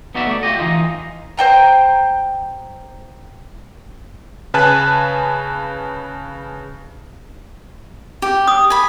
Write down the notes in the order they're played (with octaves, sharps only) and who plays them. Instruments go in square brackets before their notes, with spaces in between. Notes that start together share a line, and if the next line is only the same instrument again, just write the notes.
[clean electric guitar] B3 D#4 F#4 D5 E5
A3 D5
F4 G4 D#5
E3 D#4 F4 D#5
[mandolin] C5 D#5 G5 A#5
[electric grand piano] C#3 B4 G#5 A5 F#6
[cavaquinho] G4
[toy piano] D#6
[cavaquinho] G#5 B5